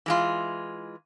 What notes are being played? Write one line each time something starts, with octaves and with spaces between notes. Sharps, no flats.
E3 G#3 F4